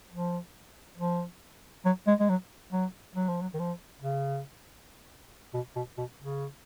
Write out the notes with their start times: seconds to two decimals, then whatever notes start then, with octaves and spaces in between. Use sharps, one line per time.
0.12 F3
0.98 F3
1.85 F#3
2.07 G#3
2.20 G#3
2.29 F#3
2.72 F#3
3.16 F#3
3.29 F3
3.42 F#3
3.54 D#3
3.59 F3
4.02 C#3
5.54 B2
5.76 B2
5.98 B2
6.20 C#3